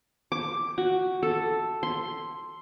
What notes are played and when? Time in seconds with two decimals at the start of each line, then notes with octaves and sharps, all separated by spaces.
0.32 D6
0.78 F#4
1.23 A4
1.83 C6